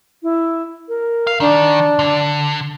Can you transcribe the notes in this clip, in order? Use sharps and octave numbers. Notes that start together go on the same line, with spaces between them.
E4
A#4
F5
D#3 D4
D3